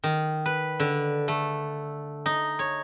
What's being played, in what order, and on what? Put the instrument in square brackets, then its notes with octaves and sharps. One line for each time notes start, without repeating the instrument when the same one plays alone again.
[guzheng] D#3
B4
D3
A3
D#4
C#5